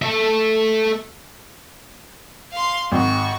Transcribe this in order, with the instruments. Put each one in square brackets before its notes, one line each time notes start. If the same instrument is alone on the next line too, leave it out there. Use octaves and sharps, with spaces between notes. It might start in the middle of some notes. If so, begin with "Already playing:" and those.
[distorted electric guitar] A3 E5
[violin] F5 C6
[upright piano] G#1 [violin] F#4 C#6